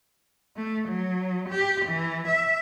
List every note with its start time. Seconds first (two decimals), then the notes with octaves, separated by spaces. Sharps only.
0.57 A3
0.88 F#3
1.49 G4
1.86 E3
2.28 E5